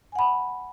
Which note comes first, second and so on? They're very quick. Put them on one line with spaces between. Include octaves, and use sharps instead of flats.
G#5 F#5 B5